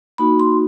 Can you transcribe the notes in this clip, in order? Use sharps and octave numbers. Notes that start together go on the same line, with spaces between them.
A#3 D#4 F#4 B5
C6